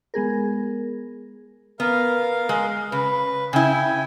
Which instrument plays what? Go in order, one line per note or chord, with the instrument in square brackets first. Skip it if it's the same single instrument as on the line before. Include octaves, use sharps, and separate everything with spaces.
[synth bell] G#3 B3 G#4 A#4
[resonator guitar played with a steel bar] B3 [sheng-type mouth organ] A#4 F5
[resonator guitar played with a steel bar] G#3
[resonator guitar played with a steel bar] C#3 [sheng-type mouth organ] B4
[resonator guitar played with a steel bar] C#3 E4 [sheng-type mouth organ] G5 G#5